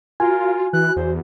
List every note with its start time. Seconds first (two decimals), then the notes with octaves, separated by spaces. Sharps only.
0.20 F4 F#4 A#4 G#5
0.73 E3 F#6
0.96 E2 C5